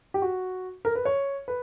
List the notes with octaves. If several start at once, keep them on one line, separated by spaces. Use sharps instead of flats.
G4
F#4
A#4
B4
C#5
B4